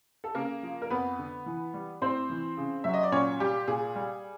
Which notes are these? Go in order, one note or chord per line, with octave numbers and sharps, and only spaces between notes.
A4
C#3 A#3 A#4
F3
A#4
F2 B3 B4
D3
E3
G3
A2 C4 C5
E3
C#3
F#3 E5
D#5
D5
A#2 C#4 C#5
G3 G4
A#2 G#4
G3